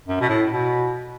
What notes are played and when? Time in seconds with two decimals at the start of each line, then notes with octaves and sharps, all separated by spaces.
0.08 F#2
0.21 B2
0.29 A2
0.50 B2